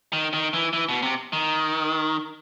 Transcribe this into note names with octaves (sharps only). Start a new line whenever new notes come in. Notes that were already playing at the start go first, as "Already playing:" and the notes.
D#3
D#3
E3
E3
B2
C3
D#3